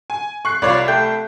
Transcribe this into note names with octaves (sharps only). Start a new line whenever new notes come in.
G#5
C#6 F#6 C7
C2 F4 C#5 D5
A3 G5